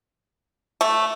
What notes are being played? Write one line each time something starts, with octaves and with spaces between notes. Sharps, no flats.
A3